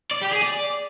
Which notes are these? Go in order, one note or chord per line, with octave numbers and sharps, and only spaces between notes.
D5
G4
G#4
D5